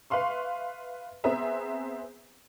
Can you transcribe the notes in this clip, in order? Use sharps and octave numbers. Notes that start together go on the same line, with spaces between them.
B4 E5 F5 C6 C#6
B3 C4 G#4 B4 E5 A#5